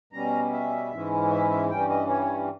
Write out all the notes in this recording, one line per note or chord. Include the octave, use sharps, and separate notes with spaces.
B2 G3 C#4 A#5
E5
G#2 E3 G#3 C#4 E4
E5
E5
G2 E3 G3 C#4 G5
D#5
C#5